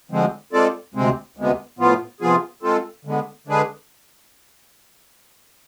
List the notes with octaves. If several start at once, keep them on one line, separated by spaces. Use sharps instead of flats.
D2 D3 F3 G#3 C4
G#3 C4 F4 A4 D5
D2 C3 G#3 C4
D2 C3 G#3 B3
A2 F3 B3 F4
C3 F3 B3 F4 G#4
G#3 C4 F4 A4
D3 G#3 B3
D3 G#3 D4 G#4 B4